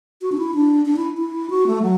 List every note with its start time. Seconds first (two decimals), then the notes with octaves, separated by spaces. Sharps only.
0.22 F#4
0.32 D4
0.38 E4
0.55 D4
0.86 D4
0.97 E4
1.18 E4
1.50 F#4
1.67 A3
1.82 F#3